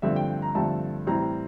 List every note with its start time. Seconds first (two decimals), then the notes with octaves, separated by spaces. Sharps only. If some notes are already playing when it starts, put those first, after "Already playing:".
0.02 G2 D3 F3 A3 C4 E5
0.16 G5
0.28 G5
0.42 A#5
0.55 G2 D3 F3 A3 C4 A5
1.06 A2 E3 G3 C4 A#5